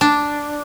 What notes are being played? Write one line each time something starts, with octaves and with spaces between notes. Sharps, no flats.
D4